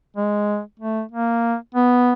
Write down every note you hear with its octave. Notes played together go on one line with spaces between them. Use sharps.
G#3
A3
A#3
B3